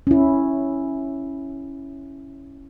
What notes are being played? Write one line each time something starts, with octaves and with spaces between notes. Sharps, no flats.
C#4 E4